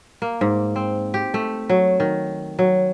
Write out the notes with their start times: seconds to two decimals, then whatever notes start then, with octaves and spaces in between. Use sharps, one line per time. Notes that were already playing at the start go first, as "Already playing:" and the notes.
0.22 A#3
0.41 G#2
0.76 C4
1.14 G4
1.34 A3
1.69 F#3
2.00 D#3
2.59 F#3